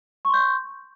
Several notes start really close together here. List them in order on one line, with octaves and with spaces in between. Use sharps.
C#6 C6 G6